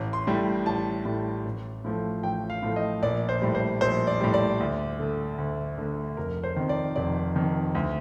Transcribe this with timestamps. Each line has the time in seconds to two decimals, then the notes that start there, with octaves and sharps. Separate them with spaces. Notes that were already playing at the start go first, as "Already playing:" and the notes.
Already playing: A1
0.13 C6
0.27 A2 G3
0.66 A1 A5
1.05 A2 G3
1.45 A1
1.84 A2 F3 A3
2.23 A1 G5
2.50 F5
2.62 A2 F3 A3
2.76 D#5
3.02 A#1 D5
3.29 C5
3.42 A2 G3
3.55 C5
3.81 A#1 C5
4.07 D5
4.20 A2 G3
4.34 D5
4.60 D2
4.99 D3 A3
5.38 D2
5.78 D3 A3
6.17 F1 A#4
6.44 C5
6.56 F2 D#3
6.69 D5
6.96 F1 D5
7.35 F2 D#3
7.75 D2